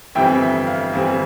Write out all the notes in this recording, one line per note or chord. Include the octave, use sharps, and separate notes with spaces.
G1 F2 E3 G3 C4 E5 G5
E5
F5
G1 F2 E3 G3 C4